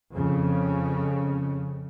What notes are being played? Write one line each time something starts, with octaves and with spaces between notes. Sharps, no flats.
F2 C#3